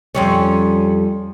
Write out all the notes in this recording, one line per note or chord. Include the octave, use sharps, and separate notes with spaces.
F2 G3 C#4